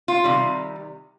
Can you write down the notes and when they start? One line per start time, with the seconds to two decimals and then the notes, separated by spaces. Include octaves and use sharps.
0.08 F4
0.24 C3 D#3 G3